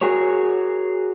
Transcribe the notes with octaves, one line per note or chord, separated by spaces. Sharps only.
F#4 G#4 A#4 C#5